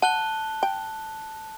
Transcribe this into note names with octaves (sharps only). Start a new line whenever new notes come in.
F#5 A5 F#6 G7
G5